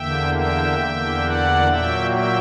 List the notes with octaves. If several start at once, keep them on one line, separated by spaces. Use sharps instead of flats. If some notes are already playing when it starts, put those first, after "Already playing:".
Already playing: E2 D3 A#3 E5 G5
E5 G5
E2 D3 A#3
D5 F#5
A#2 F#3 A#3 E5 G5
E5 G5